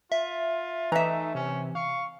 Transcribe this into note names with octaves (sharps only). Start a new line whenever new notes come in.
F4 E5
E3 A3 D#4 E5 A#5
C3 C#4
F5 C#6